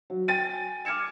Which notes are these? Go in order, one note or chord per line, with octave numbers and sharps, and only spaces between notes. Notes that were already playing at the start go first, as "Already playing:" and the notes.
F#3
G5 G#5 A6 D#7
D6 F6 G#6 C#7 E7